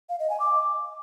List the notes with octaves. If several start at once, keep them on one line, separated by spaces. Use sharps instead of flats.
F5
D#5
G#5
D6